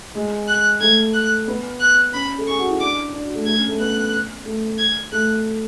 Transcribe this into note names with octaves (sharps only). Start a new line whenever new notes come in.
G#3
F#6
A3 G#6
F#6
B3
F#6
C#4 B5
A4
G#4 C#6
F#4
E4
D4 D6
D4
F#4
A3
A3 G#6
C#4
A3
B3 F#6
A3
G#6
A3 F#6